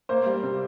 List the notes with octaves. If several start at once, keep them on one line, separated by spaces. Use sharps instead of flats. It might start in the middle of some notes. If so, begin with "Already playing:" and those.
A#3 C5
G3
C3